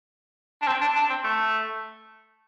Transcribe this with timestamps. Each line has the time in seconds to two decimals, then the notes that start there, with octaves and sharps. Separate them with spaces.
0.62 D4
0.67 C4
0.81 D4
0.96 D4
1.10 C4
1.24 A3